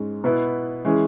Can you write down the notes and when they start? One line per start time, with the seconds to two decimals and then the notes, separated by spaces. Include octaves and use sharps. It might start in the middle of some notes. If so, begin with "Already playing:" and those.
Already playing: G#2 G#3 C#4
0.24 B2 B3 E4 B4
0.85 E3 G#3 C#4 G#4